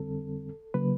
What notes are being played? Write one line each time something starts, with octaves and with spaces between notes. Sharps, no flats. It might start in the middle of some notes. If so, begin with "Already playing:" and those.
Already playing: F2 D3 G3 C4 A4
C#3 F#3 A#3 B4